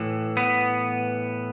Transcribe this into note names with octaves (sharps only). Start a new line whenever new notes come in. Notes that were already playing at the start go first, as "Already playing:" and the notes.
Already playing: A2 E3
B3